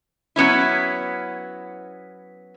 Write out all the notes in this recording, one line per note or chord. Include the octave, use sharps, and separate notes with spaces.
F#3 B3 C#4 E4